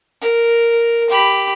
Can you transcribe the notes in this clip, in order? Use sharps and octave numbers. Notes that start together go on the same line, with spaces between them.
A#4
G4 B5